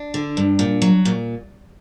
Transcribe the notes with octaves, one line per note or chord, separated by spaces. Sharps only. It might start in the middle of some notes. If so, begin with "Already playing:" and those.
Already playing: D4
D3
G2
A#2
F#3
A#2